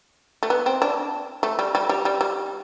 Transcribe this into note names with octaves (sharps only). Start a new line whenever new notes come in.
A3
B3
C4
D4
A3
G3
G3
G3
G3
G3